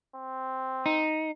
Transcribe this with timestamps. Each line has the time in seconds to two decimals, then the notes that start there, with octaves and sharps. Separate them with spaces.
0.16 C4
0.86 D#4